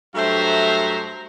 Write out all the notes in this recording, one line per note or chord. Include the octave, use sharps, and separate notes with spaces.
G2 F#3 A3 C5 E5 A#5